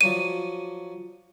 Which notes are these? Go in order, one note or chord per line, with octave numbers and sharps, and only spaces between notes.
F3 F#3 D5 D#7